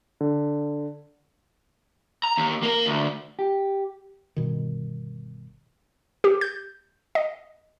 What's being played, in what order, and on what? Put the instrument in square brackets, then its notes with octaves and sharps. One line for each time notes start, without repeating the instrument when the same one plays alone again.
[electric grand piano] D3
[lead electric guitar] A#5
D#2
A#3 A#4
D2
[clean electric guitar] G4
[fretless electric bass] G1 B2 D#3
[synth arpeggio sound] G4
G6
D#5